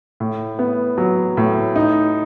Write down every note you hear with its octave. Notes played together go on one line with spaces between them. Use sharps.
A2
B3
F#3
A2
D#4